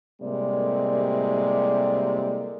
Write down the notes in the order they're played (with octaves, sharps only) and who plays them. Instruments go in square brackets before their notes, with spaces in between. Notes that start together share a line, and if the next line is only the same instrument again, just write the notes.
[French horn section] A2 C3 G3 G#3 A#3 D5